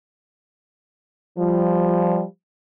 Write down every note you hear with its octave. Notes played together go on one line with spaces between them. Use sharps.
F3 G3